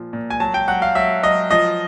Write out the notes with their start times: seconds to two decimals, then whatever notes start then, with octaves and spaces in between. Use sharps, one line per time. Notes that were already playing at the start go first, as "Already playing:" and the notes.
Already playing: A#2 F3
0.13 A#2
0.30 G#5
0.40 F#3 A5
0.54 G5
0.68 F#3 F#5
0.82 F5
0.95 F#3 E5
1.23 F#3 D#5
1.51 F3 D#5